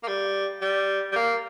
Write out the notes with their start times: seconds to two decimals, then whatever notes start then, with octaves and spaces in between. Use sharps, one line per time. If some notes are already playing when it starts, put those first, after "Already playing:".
0.03 A#3
0.08 G3
0.62 G3
1.12 G3
1.16 A#3